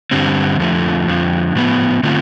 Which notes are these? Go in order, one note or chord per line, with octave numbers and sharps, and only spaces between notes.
G2 D3 G3 C4
F2 D3 F3 A3
F2 D3 F3
A2 F3 B3
D3 A3 C4 F4